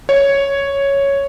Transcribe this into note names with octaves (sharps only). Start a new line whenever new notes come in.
C#5